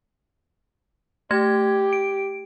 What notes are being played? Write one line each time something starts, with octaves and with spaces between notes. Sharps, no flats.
A3 G4 G#6
D7